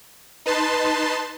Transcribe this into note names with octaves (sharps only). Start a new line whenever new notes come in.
D#4 B4 A5 C6